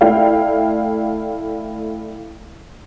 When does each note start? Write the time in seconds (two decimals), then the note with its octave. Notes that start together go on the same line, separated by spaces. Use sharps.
0.01 A3 E4 D5 E5 F5 G5